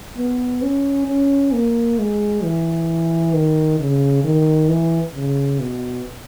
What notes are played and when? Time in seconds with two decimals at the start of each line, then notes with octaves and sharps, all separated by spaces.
0.17 B3
0.62 C#4
1.07 C#4
1.53 A#3
1.99 G#3
2.43 E3
3.34 D#3
3.79 C#3
4.24 D#3
4.69 E3
5.15 C#3
5.59 B2